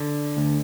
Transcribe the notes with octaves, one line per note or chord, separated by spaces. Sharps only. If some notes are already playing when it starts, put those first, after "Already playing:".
Already playing: D3
D2